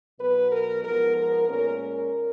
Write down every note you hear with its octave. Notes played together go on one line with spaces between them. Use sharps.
B2 F#3 B3 B4
A#4
G#2 F3 B3 A#4
A#4
A#2 G#3 C#4 A#4
A#4